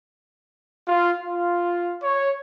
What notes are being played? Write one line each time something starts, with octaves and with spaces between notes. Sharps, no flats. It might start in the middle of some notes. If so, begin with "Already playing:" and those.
F4
F4
C#5